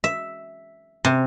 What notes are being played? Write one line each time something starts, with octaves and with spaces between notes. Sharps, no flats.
E5
C3